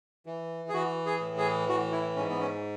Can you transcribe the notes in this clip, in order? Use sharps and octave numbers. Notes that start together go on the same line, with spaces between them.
E3
G#4
E3 F#4
G#4
A2
G#4
E3 F#4
E4
G#2 C#4
B3
C#4